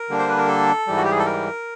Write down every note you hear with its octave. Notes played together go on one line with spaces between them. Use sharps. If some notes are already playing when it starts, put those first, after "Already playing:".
Already playing: A#4
D3 G3 A#3 D4
C5
B4
A#4
A4
G#2 E3 G3
F#4
G4
G#4
A4
A#4